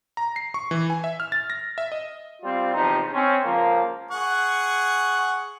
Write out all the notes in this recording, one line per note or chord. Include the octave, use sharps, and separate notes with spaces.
A#5
C7
C#6
E3
G#5
E5
F6
A6
A#6
E5
D#5
G3 C4 F4
E2 C3 F3 D#4
C4 C#4
C#2 F3 A#3
G#4 F#5 C#6